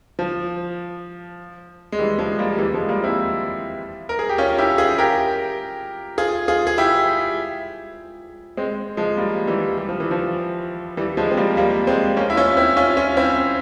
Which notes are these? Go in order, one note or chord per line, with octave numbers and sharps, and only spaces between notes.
F3
G#3
E3 G3
F3 G#3
G3 A#3
E3 G3
F3 G#3
G3 A#3
C4 E4
A#4
G#4
G4
C#4 F4
E4 G4
F4 G#4
G4 A#4
F4 G#4
F4 G#4
G#4
E4 G4
G#3 C4
F3 G#3
G3 A#3
E3 G3
G3
F3
E3
F3
E3 G3
F3 G#3
C4
G3 A#3
G3 A#3
G#3 C4
A#3 C#4
E4
C#4 F4
C4 E4
C#4 F4
C#4 F4
C4 E4